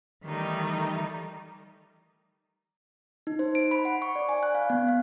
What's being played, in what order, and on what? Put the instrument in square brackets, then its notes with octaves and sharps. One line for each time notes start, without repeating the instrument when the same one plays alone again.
[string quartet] D#3 E3 G3 A3 D#4
[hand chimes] D#4
C5
D7
B5
F#5
C#6
D5
G#5
F#6
F5
B3
F5